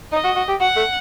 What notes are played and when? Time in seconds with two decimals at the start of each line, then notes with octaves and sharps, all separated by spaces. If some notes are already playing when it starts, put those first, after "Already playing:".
0.12 D#4 D#5
0.24 F#4
0.36 F#4
0.49 G4
0.61 F#4 F#5
0.77 A3